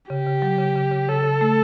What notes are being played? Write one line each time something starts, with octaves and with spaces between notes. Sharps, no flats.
C#3 G4
C#3
F#3
C#3
C#3
C#3
C#3 A4
C#3
A3